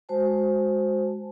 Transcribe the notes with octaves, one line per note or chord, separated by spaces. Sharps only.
G#3 F#4 C5 G#5 A5